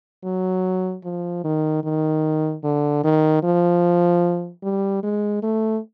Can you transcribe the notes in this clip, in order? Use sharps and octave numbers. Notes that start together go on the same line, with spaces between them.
F#3
F3
D#3
D#3
D3
D#3
F3
G3
G#3
A3